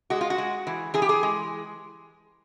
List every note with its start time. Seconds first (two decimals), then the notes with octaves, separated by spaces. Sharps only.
0.10 G#3 F#4
0.21 F4
0.30 F#4
0.38 G#3
0.67 E3
0.94 E3 G#4
1.02 G4
1.09 G#4
1.23 G#3